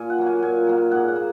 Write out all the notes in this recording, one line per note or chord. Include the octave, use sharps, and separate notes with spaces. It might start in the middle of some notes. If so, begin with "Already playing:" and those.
Already playing: A#2 G#5
F#5
F#3 A#3
G#5
A#2 G#5
F#3 A#3
G#2 F#5
F#5
A#3